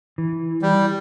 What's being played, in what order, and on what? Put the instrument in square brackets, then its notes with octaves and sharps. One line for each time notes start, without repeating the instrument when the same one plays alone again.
[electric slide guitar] E3
[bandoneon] G3